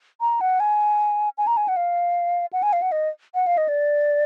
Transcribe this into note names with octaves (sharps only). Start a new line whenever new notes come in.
A#5
F#5
G#5
G#5
A#5
G#5
F#5
F5
F#5
G#5
F5
F#5
D#5
F#5
F5
D#5
D5